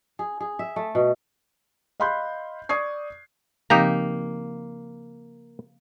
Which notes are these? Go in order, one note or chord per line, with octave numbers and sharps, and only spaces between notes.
G#4
G#4
E5
A3
B2
D#5 F5 B5 C6 F#6 G6
D5 C#6 D#6 G#6 C7
C#3 F3 A#3 C4 D#4 G4 A#5